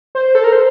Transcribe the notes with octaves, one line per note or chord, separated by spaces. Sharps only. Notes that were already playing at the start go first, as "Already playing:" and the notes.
C5
A4
A#4
C5